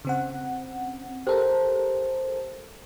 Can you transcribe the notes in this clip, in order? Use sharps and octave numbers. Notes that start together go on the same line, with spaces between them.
C#3 C4 F#5
G4 A4 A#4 C5